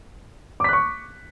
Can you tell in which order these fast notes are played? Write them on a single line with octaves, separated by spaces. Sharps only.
D6 B6 F#6 C#6